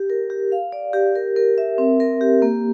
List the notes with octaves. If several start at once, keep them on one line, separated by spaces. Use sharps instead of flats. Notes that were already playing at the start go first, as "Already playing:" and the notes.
Already playing: G4
A#4
G4
F5
D5
G4
A#4
A#4
E5
C4
A#4
G4
A#3